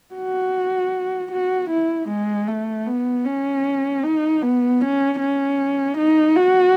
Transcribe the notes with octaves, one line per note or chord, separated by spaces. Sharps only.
F#4
F#4
E4
G#3
A3
B3
C#4
D#4
B3
C#4
C#4
D#4
F#4